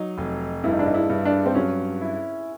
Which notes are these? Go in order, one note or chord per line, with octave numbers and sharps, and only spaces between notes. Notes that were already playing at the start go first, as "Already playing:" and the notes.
Already playing: F#3 D#4
F1
G2 E4
D#4
D4
D#4
E4
G2
D4
C4
F#3 C#4
E4